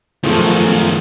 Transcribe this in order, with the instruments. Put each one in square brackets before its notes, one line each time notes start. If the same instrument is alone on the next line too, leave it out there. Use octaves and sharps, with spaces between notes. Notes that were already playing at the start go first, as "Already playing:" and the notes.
[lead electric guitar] F#2 D#3 [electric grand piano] F3 G#3 A3